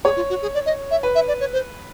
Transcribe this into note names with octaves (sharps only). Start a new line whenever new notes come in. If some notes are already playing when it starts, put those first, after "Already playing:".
G#4 C#5
F4
F#4
G#4
D5
D#5
E5
B4
E5
D5
C#5
C5